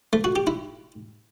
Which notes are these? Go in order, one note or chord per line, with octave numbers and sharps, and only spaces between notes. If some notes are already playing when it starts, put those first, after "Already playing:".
A3
F#4
G4
E4